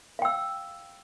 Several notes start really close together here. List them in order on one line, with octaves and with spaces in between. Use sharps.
F5 G5 E6